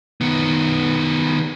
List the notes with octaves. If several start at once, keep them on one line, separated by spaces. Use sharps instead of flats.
D#3 B3